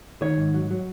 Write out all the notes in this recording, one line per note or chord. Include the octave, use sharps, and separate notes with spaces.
D#3 C#5
G#2
F#3
F#3